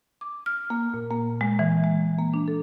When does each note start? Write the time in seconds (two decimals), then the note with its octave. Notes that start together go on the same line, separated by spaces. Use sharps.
0.21 D6
0.46 F6
0.70 A#3
0.94 A#2
1.11 A#3
1.41 G#3
1.59 E3
1.84 G#3
2.19 A#3
2.34 D4
2.48 A4